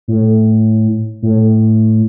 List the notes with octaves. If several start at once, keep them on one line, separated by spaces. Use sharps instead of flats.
A2
A2